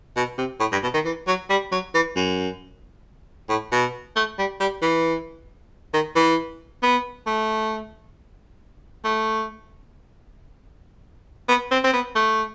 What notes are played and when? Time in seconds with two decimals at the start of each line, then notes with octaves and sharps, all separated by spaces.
0.16 B2
0.38 C3
0.60 A2
0.72 G2
0.83 B2
0.94 D#3
1.05 E3
1.27 F#3
1.50 G3
1.72 F#3
1.94 E3
2.16 F#2
3.49 A2
3.72 B2
4.16 A3
4.38 G3
4.60 G3
4.82 E3
5.93 D#3
6.16 E3
6.83 B3
7.27 A3
9.05 A3
11.49 B3
11.71 C4
11.85 C4
11.93 B3
12.16 A3